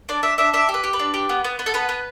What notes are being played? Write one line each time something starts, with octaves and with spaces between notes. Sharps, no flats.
D4 D5
D4 E5
D4 E5
D4 E5
G4
B4
G4
B4
D4
G4
B3
B3
B3
A4
B3 B4
B3